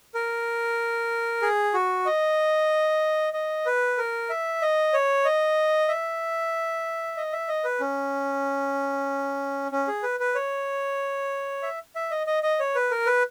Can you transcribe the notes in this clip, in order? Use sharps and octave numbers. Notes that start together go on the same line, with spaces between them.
A#4
G#4
F#4
D#5
D#5
B4
A#4
E5
D#5
C#5
D#5
E5
D#5
E5
D#5
B4
C#4
C#4
G#4
B4
B4
C#5
E5
E5
D#5
D#5
D#5
C#5
B4
A#4
B4